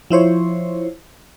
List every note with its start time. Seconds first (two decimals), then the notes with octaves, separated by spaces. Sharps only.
0.10 F3 E4 C5 C#5